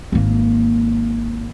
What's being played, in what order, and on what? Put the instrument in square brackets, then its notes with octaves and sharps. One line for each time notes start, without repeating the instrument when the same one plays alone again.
[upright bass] G#1 A#3